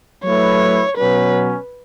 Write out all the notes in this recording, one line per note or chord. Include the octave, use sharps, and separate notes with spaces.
F#3 A3 E4 B4 C#5
B2 F#3 C#4 B4